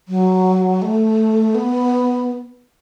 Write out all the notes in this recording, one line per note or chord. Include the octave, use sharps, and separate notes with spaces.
F#3
A3
B3